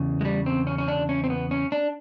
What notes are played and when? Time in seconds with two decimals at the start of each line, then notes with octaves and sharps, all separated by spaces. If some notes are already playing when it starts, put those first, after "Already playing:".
Already playing: E2 C#3
0.21 G#3
0.25 G3
0.46 C4
0.67 C#4
0.78 C#4
0.88 D4
1.09 C#4
1.24 C4
1.30 B3
1.51 C#4
1.72 D4